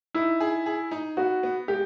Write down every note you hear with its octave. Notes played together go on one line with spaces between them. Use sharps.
D#4 E4
G#4
G#4
D#4
B3 F#4
B3
G#3 G4